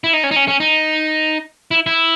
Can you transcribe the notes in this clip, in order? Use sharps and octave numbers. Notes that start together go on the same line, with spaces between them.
E4
D#4
C#4
D#4
C#4
C#4
D#4
E4
E4